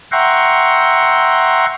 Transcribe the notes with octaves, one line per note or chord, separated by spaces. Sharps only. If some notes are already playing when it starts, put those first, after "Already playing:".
E5 F#5 G5 A#5 C6 C#6